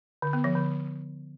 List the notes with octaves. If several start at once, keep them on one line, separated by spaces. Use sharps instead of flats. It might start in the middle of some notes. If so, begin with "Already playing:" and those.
D3
B3
F3
D3